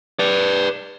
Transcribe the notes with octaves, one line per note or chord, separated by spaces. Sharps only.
B4 D5